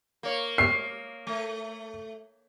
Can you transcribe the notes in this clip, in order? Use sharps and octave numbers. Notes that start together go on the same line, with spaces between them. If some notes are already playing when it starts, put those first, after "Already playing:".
A#3 C#5
C7
A3